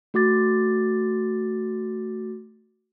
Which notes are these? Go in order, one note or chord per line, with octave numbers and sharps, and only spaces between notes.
A3 F#4 D6 A6